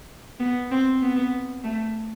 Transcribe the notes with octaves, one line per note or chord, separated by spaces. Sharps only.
B3
C4
B3
A3